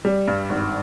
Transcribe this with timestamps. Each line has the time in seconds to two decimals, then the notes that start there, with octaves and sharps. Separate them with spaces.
0.05 G3
0.28 G2
0.49 G#1